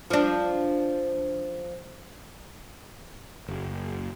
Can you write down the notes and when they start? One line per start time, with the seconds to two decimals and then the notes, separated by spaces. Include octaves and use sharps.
0.10 F3 D4
3.48 F#1